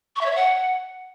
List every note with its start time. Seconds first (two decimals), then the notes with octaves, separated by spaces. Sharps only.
0.16 C#6
0.21 E5
0.26 C#5
0.31 E5
0.36 F#5